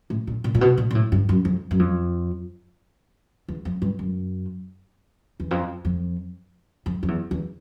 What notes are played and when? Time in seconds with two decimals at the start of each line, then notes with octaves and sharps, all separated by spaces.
0.10 A2
0.27 A#2
0.44 A#2
0.55 A#2
0.61 B2
0.78 A#2
0.91 A#2
0.95 A2
1.12 G2
1.29 F#2
1.45 F2
1.71 F#2
1.79 F2
3.48 E2
3.65 F2
3.82 G2
3.99 F#2
5.40 E2
5.51 F2
5.85 F2
6.86 F2
7.03 F2
7.08 E2
7.31 E2